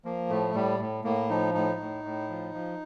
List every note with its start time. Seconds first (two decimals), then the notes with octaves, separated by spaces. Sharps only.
0.05 F3 A#3
0.30 A2 A3
0.54 A2 G3
0.80 A2
1.04 A2 A#3
1.30 F3 D#4
1.54 A2 D#4
1.79 A2
2.04 A2
2.29 F3
2.54 F3